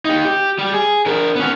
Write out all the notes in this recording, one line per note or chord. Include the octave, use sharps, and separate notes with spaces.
D#4 G4
G4
G3 G4
G#4
D4 A#4
B3 C#4